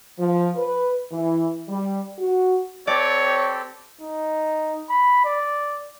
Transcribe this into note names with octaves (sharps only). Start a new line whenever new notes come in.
F3
B4
E3
G3
F#4
C4 G4 A4 C#5 D5
D#4
B5
D5